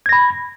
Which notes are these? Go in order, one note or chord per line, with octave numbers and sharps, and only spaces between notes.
B5 G#6 A#6